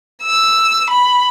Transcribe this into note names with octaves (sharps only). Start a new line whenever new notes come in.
E6
B5